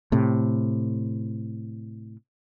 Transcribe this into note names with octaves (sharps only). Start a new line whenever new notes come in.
A2 C3